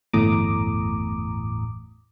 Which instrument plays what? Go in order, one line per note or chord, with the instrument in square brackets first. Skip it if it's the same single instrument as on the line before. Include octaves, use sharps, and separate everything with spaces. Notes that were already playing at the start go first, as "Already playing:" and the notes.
[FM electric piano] G1 E2 A2 A#5 D6 D#6